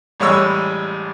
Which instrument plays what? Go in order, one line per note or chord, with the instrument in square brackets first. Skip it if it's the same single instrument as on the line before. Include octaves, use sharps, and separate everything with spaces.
[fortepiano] A1 G3 G#3 C#5 B5 E6